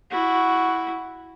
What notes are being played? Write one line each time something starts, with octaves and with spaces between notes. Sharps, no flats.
E4 F#4